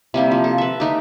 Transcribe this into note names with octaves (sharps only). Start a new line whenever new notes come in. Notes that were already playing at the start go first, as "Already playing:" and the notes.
C3 G3 A#3 E4
F3
A4
B4 E5
A3 D#4 G4